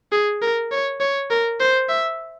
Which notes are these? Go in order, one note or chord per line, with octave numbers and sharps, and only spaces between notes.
G#4
A#4
C#5
C#5
A#4
C5
E5